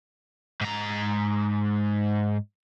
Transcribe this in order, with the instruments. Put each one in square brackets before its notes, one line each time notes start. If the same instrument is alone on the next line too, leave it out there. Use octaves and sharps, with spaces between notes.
[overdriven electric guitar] G#2 A#5